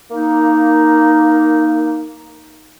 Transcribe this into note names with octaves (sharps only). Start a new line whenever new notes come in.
A#3 D#4